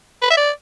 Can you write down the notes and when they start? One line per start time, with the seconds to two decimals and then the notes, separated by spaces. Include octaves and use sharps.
0.22 B4
0.31 E5
0.37 D5